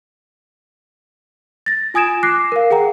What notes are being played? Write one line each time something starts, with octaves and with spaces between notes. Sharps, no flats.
A6 A#6
F4 G#5 D#6 G#6 D7 E7
D6 F#6 A#6 C7
A#4 F5
G#4 F#5 G5 A#5